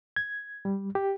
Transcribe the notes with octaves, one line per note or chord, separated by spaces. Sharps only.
G#6
G3
G4